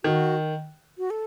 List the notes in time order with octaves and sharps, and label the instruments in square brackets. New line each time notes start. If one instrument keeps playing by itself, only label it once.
[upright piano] D#3 [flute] F#4
[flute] F#4
A4